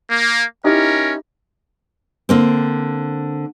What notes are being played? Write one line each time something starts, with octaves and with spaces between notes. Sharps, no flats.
A#3
C#4 D#4 E4 G4 A#4
D3 A#3 C4